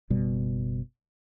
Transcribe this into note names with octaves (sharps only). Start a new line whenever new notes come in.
F#1 B2 G3